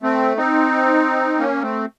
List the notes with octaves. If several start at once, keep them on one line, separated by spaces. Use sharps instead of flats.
A3 C4
C4 D#4
A#3 C#4
A3 C4